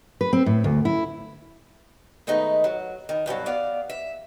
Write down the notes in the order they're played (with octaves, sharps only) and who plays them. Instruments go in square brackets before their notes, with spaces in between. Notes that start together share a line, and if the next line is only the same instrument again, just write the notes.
[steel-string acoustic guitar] B4
C4
A2
D2
E4
D#3 G#3 A3 B3 D#4
F#3
D#3
G2 B2 F3 F#3
B3 D5 F5
E5